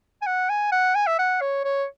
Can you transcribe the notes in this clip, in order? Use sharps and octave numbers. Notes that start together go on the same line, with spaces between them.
G#5
F#5
G#5
F#5
G#5
E5
F#5
C#5
C#5